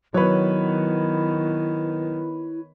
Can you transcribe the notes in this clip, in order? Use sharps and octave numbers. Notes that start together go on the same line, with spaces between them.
D#3 F#3 B3 E4 B4 C#5